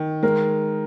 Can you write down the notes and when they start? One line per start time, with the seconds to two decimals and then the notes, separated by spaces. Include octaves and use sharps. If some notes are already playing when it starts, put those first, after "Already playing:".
Already playing: D#3
0.23 G#3 A#4